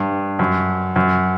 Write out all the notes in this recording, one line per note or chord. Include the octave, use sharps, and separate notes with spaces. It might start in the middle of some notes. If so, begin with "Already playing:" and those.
Already playing: G2
F#2
F#2